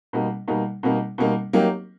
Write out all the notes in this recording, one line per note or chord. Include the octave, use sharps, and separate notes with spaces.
B2 G3 A#3 D#4
B2 G3 A#3 D#4
B2 G3 A#3 D#4
B2 G3 A#3 D#4
F#3 A#3 D#4 G4